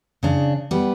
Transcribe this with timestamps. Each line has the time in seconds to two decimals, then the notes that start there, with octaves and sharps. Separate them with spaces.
0.23 C#3 D4
0.71 G3 B3